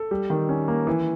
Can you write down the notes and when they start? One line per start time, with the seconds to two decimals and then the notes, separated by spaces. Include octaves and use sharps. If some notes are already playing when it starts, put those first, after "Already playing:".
Already playing: A4
0.11 G3
0.30 D#3
0.49 C#4
0.68 A#3
0.87 E3